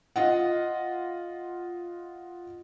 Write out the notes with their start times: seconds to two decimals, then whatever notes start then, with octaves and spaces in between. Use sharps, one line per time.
0.16 F4 D#5 F#5